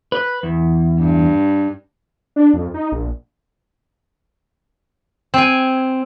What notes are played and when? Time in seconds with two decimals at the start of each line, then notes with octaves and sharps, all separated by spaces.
0.12 B4
0.43 E2
1.00 G2
2.36 D4
2.54 F2
2.74 D#4
2.92 A#1
5.34 C4 G#5